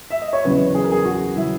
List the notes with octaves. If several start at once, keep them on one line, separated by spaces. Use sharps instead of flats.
E5
D#5
C#5
E2 C#3 F#3 C#4 B4
G#4
A#4
G#4
F#4
C#3 F#3 C#4 E4